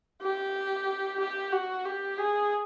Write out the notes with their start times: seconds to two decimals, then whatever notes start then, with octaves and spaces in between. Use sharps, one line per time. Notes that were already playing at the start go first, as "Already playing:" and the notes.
0.22 G4
1.20 G4
1.52 F#4
1.85 G4
2.18 G#4